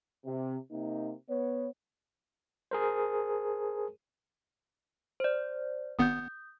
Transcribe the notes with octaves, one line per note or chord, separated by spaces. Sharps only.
C3
C3 A#3 D#4
B3 C#5
G#4 A#4 C5
C5 D5
G#1 B3 D#6 G6